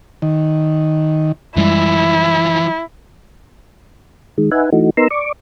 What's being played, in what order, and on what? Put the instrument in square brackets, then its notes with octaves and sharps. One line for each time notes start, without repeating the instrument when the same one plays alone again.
[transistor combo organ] D#3
[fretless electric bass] F#2 G3 G#3 [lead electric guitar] E3 F3 [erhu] E4
[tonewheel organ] D#3 G#3
D#4 B4 E5 F#5 G#5
E3 A3 D#4 F#4
B3 D#4 A#4 A#5 C6 E6
D5 C#6 D6